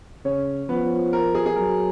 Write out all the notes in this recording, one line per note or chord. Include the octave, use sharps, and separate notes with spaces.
C#3 C#4 C#5
F3 B3 B4
A#4
G#4
G#4
F#3 A#4